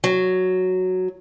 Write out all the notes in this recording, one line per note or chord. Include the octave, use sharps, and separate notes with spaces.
F#3